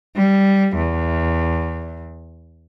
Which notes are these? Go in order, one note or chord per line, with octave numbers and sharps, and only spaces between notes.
G3
E2